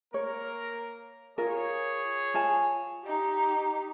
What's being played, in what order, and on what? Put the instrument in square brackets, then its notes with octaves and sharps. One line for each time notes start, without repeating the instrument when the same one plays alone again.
[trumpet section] A#3 A#4 [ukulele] C#5
[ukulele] F4 A#4 [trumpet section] G#4 C#5
[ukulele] F4 G#5 A5
[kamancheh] D#4 G4